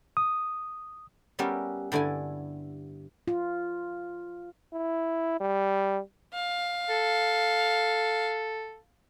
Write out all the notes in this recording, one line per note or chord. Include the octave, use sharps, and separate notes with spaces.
D#6
G3 B3 C#4 G4 A#4 E5
G2 D3 E4 D5 G#5
F4
E4
G3
F5
A4